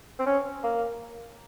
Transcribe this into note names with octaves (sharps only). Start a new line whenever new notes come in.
C4
C#4
A#3